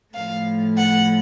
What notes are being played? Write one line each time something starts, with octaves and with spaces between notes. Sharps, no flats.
A2 F3 A3 F5
F#5